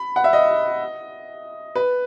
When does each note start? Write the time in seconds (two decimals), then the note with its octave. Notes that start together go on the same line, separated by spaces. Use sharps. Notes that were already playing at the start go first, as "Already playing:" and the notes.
Already playing: B5
0.16 F#5
0.24 E5
0.33 D#5
1.75 B4